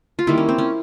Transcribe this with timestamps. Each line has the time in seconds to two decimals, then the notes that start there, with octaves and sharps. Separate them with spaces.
0.19 F4
0.27 D#3 G3 A#3 E4
0.38 C#4
0.49 C4
0.58 C#4